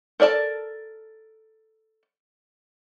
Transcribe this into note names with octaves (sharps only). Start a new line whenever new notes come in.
A4 A#4 D5 D#5 A5